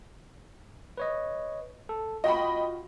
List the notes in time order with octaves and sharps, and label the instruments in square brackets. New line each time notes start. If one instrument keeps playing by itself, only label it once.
[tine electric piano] B4 C#5 D#5
A4
[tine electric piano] F4 F#4 [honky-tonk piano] D#5 G5 B5